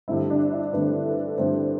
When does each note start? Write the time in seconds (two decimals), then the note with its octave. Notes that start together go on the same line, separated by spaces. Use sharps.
0.08 G2 D3 A3 C4 E4
0.30 D4
0.51 E4
0.73 G2 D3 A3 C4 B4
1.05 A4
1.38 G2 D3 A3 C4 C5